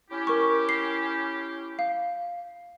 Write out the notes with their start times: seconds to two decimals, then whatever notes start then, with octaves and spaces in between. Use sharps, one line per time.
0.10 C#4 E4 G4
0.27 A#4 C#6
0.69 C7
1.79 F5